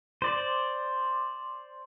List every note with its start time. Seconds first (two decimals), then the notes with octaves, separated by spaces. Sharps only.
0.22 C5 D5